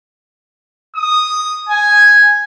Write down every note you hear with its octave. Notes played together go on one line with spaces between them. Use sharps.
D#6
G#5